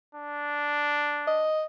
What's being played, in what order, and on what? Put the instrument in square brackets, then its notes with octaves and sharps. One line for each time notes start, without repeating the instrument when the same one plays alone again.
[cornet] D4
[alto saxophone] D#5